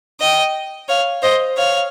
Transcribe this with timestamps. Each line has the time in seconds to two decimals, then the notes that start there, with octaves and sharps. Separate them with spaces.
0.20 D#5 G5
0.88 C#5 F5
1.22 C5 D#5
1.56 C#5 F5